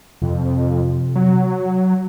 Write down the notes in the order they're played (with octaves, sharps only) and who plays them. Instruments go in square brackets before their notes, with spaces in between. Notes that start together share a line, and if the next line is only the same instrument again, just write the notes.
[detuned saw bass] F2 [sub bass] C3
[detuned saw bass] F#3